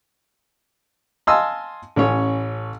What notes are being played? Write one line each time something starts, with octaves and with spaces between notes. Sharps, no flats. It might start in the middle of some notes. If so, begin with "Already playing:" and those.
D#5 F5 G#5 A5 C6 E6
A1 C#4 C#5